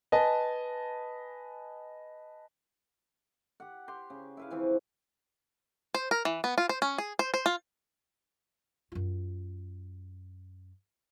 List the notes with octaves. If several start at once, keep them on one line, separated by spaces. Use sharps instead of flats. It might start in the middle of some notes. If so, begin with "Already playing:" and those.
B4 D#5 G#5 A5
G4 F#5
G4 C6
C#3
E4 B4 F5
C#3 E3 F3 C4
C5
A#4
E3
B3
F4
C5
C#4
G#4
C5
C5
F4
F#2 F4